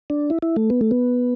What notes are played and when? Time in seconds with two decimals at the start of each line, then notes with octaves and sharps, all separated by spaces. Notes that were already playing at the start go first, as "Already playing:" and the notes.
0.10 D4
0.30 E4
0.42 E4
0.56 A3
0.70 B3
0.81 A3
0.91 B3